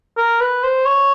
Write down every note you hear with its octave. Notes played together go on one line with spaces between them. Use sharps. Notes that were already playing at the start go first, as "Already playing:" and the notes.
A#4
B4
C5
C#5